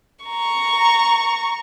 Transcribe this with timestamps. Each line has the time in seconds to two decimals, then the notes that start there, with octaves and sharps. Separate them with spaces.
0.25 A#5 C#6